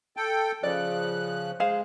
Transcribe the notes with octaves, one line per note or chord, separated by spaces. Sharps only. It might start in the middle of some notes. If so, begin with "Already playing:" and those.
A4 G5
C#3 F3 D5 F#6
G#3 G#4 C5 F5